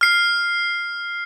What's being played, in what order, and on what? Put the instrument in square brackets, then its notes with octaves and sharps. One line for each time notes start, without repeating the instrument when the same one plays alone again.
[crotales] F6 C7